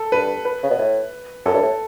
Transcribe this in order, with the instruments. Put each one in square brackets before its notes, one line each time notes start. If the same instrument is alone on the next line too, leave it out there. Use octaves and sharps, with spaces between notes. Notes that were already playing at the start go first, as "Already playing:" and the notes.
Already playing: [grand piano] A4
[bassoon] G2 [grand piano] B4
[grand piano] B4
[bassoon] C#3
B2
A2
[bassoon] F#2 [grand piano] A4
[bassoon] G2
A2